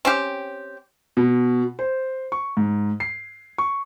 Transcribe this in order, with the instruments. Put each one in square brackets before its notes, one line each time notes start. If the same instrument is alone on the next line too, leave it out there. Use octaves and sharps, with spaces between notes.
[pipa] C4 C#4 G4
[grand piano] B2
C5
C#6
G#2
C7
C#6